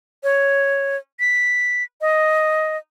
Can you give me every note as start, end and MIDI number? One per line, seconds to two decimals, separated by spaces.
0.23 0.97 73
1.20 1.84 95
2.01 2.77 75